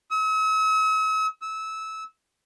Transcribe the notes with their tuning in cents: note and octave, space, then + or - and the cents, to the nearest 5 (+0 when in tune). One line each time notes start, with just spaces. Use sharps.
E6 -45
E6 -20